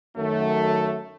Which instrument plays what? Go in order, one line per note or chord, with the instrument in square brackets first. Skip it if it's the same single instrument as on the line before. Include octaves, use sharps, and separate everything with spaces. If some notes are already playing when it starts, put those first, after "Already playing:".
[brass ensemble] F#2 D#3 F#3 A3